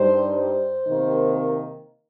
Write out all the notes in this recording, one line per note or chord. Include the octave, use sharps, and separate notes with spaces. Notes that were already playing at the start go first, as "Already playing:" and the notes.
Already playing: G2 G3 D#4 C5
C5
C3 D#3 A#3 D#4